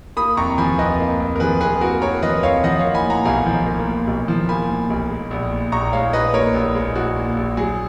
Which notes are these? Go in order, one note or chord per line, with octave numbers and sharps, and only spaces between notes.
A#3 B5 D#6
F2 A#5 C#6
F3 G#5 B5
F2 B4 D#5
A#3
F2
A#4
F3 G#4 B4
F2 G#4 B4
A#3 F#4 A#4
F2 A#4 C#5
F3 B4 D#5
F2 C#5 F5
F3 D#5 F#5
F#5
A#3 C#5 F5
G#5 B5
A#2 F#5 A#5
B1 F5 G#5
F3
A#3
A#2
B1
F3
A#3 G#5 B5
A#2
B1
G#3
A#1
A#2
A#1 A#5 C#6
G#3 C#5 F5
A#1 B4 D#5
A#2 A#4 C#5
A#1
G#3
A#1 F#4
A#2
A#1
F#3 G#4